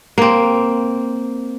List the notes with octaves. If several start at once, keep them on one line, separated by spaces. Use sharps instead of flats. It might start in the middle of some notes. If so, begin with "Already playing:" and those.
A#3 C4